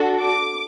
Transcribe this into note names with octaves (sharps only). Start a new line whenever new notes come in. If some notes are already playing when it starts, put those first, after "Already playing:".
Already playing: D4 F#4 A4
D6